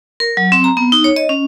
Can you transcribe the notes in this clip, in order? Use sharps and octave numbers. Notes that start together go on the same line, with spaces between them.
A#4
F#3
C4
A#5
B3
D#4
C#5
D#5
C#4